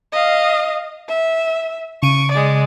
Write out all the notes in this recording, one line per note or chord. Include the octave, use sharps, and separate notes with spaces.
D#5 F5
E5
C#3 C#6 D7 D#7
G#3 D5